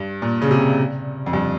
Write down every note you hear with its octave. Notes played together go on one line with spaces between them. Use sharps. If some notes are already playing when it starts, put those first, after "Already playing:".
Already playing: G2
A#2
C#3
C3
F2
G2